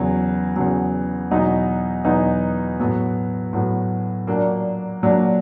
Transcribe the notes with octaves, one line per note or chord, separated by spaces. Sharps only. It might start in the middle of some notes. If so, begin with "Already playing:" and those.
Already playing: E2 C#3 F#3
E2 C#3 F#3
E2 B2 F#3 B3 D#4
E2 B2 F#3 B3 D#4
A2 F#3 B3
A2 F#3 B3
A#2 F#3 A#3 D4
A#2 F#3 A#3 D4